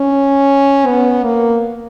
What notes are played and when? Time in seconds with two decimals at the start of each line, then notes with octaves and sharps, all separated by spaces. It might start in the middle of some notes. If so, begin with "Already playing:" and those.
Already playing: C#4
0.87 B3
1.24 A#3